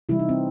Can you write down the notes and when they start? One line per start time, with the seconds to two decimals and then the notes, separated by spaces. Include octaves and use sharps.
0.09 C3 E3 G3 E4
0.19 D#4
0.29 C4